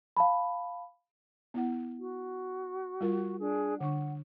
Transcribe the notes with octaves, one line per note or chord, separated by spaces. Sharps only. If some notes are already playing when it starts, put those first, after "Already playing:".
F5 A5 B5
B3 E4 F#5
F#4
G3 F4 A#4
D4 G#4
D3 D4 F#5 C#6